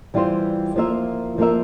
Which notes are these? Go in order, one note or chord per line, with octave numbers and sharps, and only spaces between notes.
E3 G3 C4 F4 C5
F3 A#3 F4 A#4 E5
F3 A#3 F4 A#4 E5